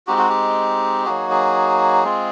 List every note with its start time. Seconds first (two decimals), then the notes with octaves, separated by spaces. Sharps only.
0.07 G#3 C4 D#4 F#4 G4
0.18 F#4
0.30 G4
1.05 F#3 A#3 D#4 F#4 G#4
1.30 G#4
2.04 G#3 C4 F4